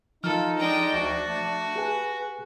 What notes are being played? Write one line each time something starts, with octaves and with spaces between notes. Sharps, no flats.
F3 D#4 F4 A4 F6
G#3 D4 G5
D2 F#4
A3
G4 G#4 B4 G#5